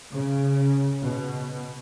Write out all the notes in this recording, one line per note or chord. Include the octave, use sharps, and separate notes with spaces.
C#3
B2